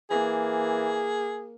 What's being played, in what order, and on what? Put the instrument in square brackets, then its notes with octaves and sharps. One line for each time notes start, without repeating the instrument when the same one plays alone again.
[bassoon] E3 [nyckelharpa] A#3 [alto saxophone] G#4